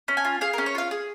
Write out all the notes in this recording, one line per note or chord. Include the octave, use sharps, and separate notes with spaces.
C#4
G#5
F4
G#4 F5
A#4
C#4
C#5
F4 F5
G#4